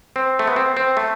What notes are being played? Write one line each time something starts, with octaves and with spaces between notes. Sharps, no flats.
C4
A3
B3
C4
C4
A3